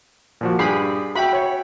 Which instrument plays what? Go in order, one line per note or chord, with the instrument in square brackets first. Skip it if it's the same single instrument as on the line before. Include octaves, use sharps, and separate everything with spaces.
[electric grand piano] A#2 F3 F#4
[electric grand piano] G2 G4 C7 [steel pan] G#4 B5
[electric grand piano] F#4 E5 G5 [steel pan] B5
[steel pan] C#5